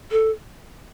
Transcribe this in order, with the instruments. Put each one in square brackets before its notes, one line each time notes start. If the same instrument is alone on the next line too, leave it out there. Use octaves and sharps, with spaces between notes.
[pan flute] A4